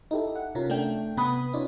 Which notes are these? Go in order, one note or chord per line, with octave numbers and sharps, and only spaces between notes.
D#4 E4 G4 A4
F#5
C3 C#4 F4 A#4
A3 D4 G5
C3 B3 B4 B5 D#6
C#4 D#4 F4 C#5 D5